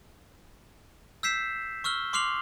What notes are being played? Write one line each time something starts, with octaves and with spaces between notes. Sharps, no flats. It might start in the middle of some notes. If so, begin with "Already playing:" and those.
E6 G6 B6 C7 E7
C#6 E6 F6 G7
C6 D6 F6 C7 F7 F#7